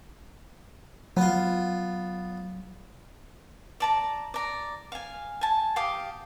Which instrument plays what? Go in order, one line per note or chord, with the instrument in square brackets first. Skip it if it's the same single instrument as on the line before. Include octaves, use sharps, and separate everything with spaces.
[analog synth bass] F#3 [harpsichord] B3 F4
[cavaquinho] D5 A5 A#5
D5 A#5
F5 G#5
G#5 A5
G4 F5 D6 D#6